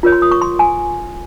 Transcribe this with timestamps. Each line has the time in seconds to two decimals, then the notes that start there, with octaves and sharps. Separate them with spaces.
0.03 F4 A#4 C#5
0.12 C6
0.22 D#6
0.32 C#6
0.42 C6
0.59 G#5